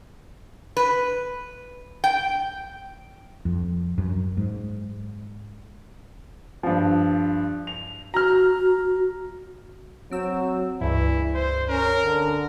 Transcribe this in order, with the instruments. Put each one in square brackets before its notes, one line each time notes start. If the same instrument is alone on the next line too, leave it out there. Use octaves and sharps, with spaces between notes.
[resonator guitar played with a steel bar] B4
G5
[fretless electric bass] F2
F#2
G#2
[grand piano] G2 F3
F7
[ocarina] F#4 [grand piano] A#5 F6
[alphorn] F#3 [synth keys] C4 E6
[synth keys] C#2 G2 [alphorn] E3 [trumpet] E4
[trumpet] C5
[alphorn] C#4 [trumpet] A#4
[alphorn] D3